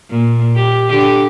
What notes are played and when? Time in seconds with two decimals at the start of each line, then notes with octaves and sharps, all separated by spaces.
0.10 A#2
0.55 G4
0.90 D3 G4